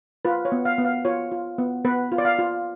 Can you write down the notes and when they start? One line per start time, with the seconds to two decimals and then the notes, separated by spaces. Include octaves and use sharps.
0.25 F4 B4
0.45 C#5
0.52 B3
0.65 F5
0.78 B3
0.85 F5
1.05 F4 C#5
1.32 F4
1.58 B3
1.85 B3 B4
2.12 F4
2.18 D5
2.25 F5
2.39 F4